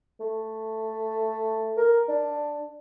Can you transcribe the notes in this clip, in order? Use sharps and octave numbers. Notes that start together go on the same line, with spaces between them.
A3
A#4
D4